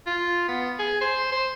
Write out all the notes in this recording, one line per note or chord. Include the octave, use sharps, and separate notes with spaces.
F4
B3
G#4
C5
C5